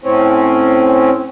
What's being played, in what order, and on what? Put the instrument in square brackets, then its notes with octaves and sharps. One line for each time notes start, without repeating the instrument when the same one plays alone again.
[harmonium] A2 C4 C#4